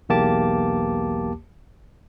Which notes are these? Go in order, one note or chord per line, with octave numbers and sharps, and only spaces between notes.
B1 E2 A#3 G4 A5 D6